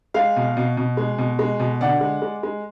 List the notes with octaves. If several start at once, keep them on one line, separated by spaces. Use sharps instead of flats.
G#3 F5
B2
B2
B2
G#3
B2
G#3
B2
D3 D5 F#5
G#3
G#3
G#3